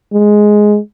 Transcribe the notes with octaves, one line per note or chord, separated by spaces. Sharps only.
G#3